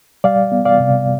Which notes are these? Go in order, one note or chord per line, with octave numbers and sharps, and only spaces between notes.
G3 D5 F5
B3
D5 F5
C3